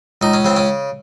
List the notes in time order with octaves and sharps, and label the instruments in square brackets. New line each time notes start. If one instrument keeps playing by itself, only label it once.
[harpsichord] C#2 D#4
C#4
C#3 C4
C#4